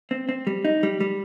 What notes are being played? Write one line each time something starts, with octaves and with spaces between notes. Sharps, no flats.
C4
C4
G3
D#4
G3
G3